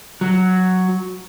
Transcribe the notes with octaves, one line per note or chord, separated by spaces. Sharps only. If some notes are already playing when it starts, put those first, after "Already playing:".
F#3